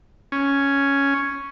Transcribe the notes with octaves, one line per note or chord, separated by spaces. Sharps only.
C#4